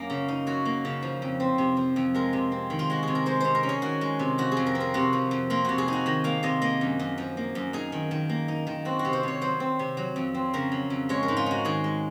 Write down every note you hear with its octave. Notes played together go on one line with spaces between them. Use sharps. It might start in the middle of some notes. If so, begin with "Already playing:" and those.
Already playing: F#2 F#3 A#3
C#3
D#4
F#3 F#4
A#3
C#3
F3
F2
C4
C3
F3
F2
G#3 A#4
C3
C4
D#3
F4
G#3 F#4
C3 G#4
A#4
G#3 C5
C3 C5
A#4
C#4
G#4
D#3 F#4
G#3
C3
F3 F#4
G#4
F2
A#4
C4
A#4
C3 F#4
F3
F2
A#3 F4
C3 F#4
G#4
D#4 F#4
D#3 D#5
A#3 F5
C3 D#5
A#3 D#5
F#2
F#2
F3
A#3
F#2
D#4 G#4
D#3
D#3
A#3
D#4
D#3
C4 F#4
F#4
C3
C5
C3 C#5
F#3 C5
C4
C3
F#3
F2
C4
C#3 A#4
F#3
F2
G#3 C#5
A#4
G#2
F4
D#4 F#4
D#3 G#4
G#3